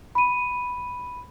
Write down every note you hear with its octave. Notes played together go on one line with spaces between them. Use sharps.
B5 D#7